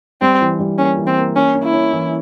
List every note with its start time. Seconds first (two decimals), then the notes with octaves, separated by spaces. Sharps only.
0.21 G3 C4
0.41 E3
0.59 G3
0.78 A#3 C#4
0.98 E3
1.07 C4
1.17 A#3
1.36 A#3 C#4
1.55 C#4
1.63 E4
1.73 C#4
1.93 E3